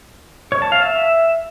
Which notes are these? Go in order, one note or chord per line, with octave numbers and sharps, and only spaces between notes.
C#5
A5
F5
E5